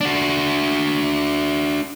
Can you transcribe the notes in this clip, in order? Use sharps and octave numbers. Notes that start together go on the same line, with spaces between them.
D4 F#4